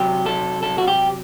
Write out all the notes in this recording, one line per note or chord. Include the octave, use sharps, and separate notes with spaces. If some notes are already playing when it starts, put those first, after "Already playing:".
Already playing: C3 F#3 G4
A4
A4
F#4
G4